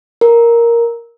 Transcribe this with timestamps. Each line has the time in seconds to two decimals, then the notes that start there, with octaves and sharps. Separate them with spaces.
0.21 A#4